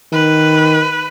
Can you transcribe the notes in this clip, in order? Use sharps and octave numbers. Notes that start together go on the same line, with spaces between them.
D#3 B4